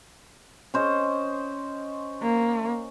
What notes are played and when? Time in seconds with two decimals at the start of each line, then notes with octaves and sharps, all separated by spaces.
0.74 C#4 C5 D#5
2.22 A#3